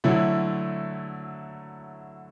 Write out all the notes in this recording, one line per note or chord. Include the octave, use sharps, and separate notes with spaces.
D3 F#3 A3 E4